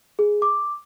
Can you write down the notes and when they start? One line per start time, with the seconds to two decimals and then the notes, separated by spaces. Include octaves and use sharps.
0.19 G#4
0.42 D6